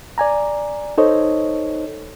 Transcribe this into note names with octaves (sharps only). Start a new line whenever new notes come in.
D5 G#5 A#5
D#4 A4 C5 C#5 D#5